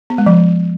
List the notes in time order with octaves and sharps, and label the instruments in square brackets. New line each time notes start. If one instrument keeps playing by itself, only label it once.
[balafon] B3
G#3
F3